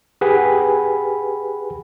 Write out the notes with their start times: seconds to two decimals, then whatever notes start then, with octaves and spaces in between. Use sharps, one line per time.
0.21 G4 G#4 B4 F#5 B5